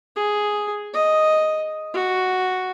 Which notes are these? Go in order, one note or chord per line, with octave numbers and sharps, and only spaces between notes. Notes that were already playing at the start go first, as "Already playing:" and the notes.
G#4
D#5
F#4